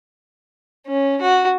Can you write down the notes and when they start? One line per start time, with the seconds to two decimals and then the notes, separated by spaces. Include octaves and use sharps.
0.86 C#4
1.21 F#4